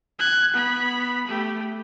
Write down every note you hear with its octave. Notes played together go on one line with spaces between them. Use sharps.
F#6 G#6
B3 B5
A3 G4